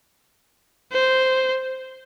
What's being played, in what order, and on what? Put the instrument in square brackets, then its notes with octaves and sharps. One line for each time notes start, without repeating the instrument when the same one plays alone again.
[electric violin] C5